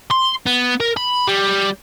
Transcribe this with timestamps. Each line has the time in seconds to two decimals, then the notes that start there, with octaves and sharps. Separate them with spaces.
0.11 C6
0.46 B3
0.81 A#4
0.97 B5
1.28 G3